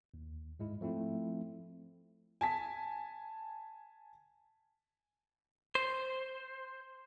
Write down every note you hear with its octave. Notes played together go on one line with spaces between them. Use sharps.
D#2
G#2 G#3 E4
F3 A3 C4 E4
G#5 A5 B6
C5